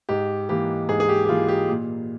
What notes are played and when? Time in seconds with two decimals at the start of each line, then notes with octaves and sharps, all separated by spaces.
0.09 G#2 G4
0.49 E3 A#3 G4
0.89 G#2 G#4
1.00 G#4
1.09 G4
1.25 G4
1.29 E3 A#3 F4
1.49 G4
1.69 A#2